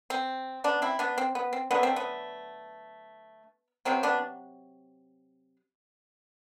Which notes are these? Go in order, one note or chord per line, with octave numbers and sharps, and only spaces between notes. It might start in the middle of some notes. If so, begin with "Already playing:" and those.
C4
B3 D4
C4 E4
B3 D4
C4
B3
C4
D3 F#3 A3 B3
C4
B3
C3 F#3 B3 C4
B3 D4